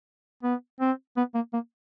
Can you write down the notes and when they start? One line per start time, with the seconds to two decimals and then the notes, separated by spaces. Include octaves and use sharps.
0.43 B3
0.81 C4
1.17 B3
1.35 A#3
1.53 A#3